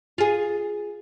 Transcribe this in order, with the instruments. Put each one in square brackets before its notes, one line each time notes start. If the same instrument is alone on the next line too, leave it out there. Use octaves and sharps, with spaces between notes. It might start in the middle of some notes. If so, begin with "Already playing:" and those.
[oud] F4 G#4